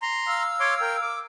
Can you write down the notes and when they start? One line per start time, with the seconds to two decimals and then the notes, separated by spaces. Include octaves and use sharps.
0.02 A#5 C6
0.27 F5 E6
0.60 C#5 C6 D6
0.81 A#4 G5
1.02 D6